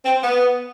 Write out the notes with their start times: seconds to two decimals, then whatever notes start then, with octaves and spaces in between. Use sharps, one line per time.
0.05 C4
0.23 B3